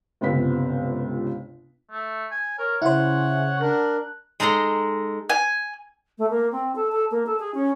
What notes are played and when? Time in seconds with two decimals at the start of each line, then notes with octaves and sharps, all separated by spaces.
0.21 G1 C#2 C3 B3 C4 B6
1.91 A3
2.31 G#5
2.59 A#4 C#5
2.82 C#3 E4 C5 F#5
3.61 D4 A#4 F#6
4.40 G#3 D#4 A4 A#5 C6
5.29 G#5
6.18 A3
6.30 A#3
6.52 C4
6.75 A4
6.92 A4
7.11 A#3
7.26 A4
7.39 G#4
7.54 C#4